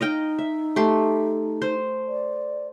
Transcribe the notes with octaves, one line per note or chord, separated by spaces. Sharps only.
D#4 D#5 F5 G5
E5
A3 G4 C6
C5
D5